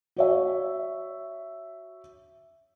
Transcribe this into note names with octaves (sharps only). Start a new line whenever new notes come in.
F#4 C#5 E5